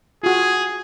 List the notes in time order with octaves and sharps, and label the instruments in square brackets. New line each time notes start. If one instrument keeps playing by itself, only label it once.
[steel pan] F4 F#4 [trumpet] G#4